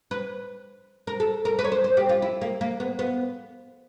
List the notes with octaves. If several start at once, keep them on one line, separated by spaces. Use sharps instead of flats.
B4
A#4
A4
A#4
B4
C#5
C5
C5
G4
F4
E4
A#3
A#3
B3
B3